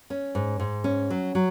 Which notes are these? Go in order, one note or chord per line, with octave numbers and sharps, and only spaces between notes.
C#4
G#2
G#2
C#4
F#3
F#3